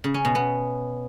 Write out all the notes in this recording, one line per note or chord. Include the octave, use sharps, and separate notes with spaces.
C#3
C#4
B2
B3